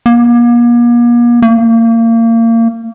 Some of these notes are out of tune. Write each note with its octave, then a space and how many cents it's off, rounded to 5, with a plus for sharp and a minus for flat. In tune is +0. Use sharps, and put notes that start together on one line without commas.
A#3 +40
A#3 -30